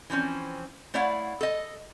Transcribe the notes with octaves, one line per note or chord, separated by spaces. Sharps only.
E3 F3 C4 C#4
A3 E4 C#5 D5 F5 F#5
A4 D#5